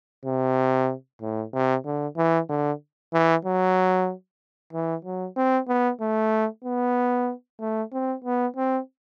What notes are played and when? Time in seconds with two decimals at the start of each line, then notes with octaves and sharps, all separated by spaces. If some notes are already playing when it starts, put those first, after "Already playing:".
0.25 C3
1.21 A2
1.53 C3
1.85 D3
2.17 E3
2.49 D3
3.13 E3
3.45 F#3
4.73 E3
5.05 F#3
5.37 C4
5.68 B3
6.01 A3
6.64 B3
7.60 A3
7.92 C4
8.24 B3
8.56 C4